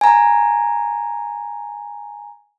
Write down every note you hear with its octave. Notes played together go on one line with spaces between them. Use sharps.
G#5 A#5